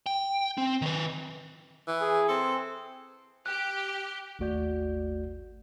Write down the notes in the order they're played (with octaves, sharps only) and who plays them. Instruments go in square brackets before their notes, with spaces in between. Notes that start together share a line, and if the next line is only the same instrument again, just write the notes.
[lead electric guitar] G5
C4
D#3 B4
[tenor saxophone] E3
[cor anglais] G#4
[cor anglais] C4 [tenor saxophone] A4
[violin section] G4 [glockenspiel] F#6
[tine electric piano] G#1 D#2 A3 F#4 D5 G6